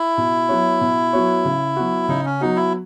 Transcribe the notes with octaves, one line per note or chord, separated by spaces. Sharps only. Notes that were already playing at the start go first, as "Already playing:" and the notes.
Already playing: E4
B2
F#3 B3 F#4 C#5
B2
F#3 B3 F#4 C#5
C#3
F#3 B3 F#4
C#3 D#4
C#4
F#3 B3 D#4 F#4
E4